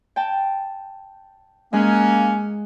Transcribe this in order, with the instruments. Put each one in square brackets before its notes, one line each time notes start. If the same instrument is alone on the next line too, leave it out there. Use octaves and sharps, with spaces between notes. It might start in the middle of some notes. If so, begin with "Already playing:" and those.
[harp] G5 A5
[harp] G#3 G#4 F#6 [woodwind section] A#3 C#4